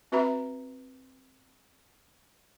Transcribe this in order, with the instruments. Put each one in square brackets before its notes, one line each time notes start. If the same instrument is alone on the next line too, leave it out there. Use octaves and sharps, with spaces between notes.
[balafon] C4 F#4 B4 E5 A#5 B5